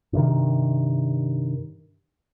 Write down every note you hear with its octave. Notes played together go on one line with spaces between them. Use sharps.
G2 C3 D#3